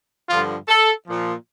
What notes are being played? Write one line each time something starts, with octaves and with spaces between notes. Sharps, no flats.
G2 D3 F3 F4
A4
A#2 F3